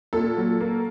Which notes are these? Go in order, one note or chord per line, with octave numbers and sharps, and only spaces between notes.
A#2 A4
F#3
A#3